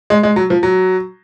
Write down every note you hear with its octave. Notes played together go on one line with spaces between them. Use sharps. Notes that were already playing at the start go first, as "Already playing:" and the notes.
G#3
G#3
F#3
F3
F#3